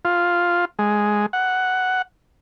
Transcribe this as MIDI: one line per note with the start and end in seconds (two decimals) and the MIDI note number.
0.05 0.65 65
0.79 1.26 56
1.33 2.02 78